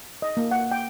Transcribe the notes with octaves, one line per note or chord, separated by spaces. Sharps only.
D#5
A#3
F#5
G5